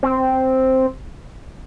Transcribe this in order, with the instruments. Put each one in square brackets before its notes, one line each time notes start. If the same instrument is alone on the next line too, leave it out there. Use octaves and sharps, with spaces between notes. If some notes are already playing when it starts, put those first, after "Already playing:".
[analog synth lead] C4